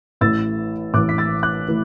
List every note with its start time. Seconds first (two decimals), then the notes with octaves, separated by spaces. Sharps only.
0.21 A1 A2 E3 E6 A6
0.94 A1 A2 E3 D6 F#6
1.09 B6
1.18 E6 A6
1.43 D6 F#6
1.68 A2 E3